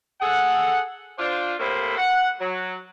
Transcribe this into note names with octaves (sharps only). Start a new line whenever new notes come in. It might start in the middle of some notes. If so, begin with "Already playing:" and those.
G#4 A4 F#5
D4 F4 C5
A2 C3 A#3 A4 C5 B5
F#5
F#3